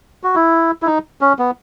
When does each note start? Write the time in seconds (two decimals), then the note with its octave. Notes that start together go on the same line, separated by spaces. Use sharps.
0.23 F#4
0.35 E4
0.82 E4
0.86 D#4
1.21 C#4
1.39 B3